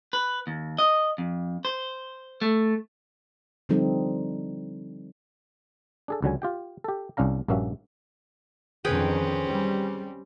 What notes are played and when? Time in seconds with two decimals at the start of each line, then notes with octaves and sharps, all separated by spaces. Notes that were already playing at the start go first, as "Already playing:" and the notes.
0.13 B4
0.47 D#2
0.79 D#5
1.18 F2
1.65 C5
2.42 A3
3.69 D3 F3 G3 C4 D#4 A4
6.08 D4 G#4 A4
6.22 C#2 D3 F#3 G#5
6.42 F4 G4 G5
6.84 G4 A4
7.17 C2 C#4 D4 F5 A#5
7.48 A#1 G2 A#3 C#4 F#4 E5
8.85 F2 D3 D#3 C4 C#4 G#4 B4 G5
9.45 G3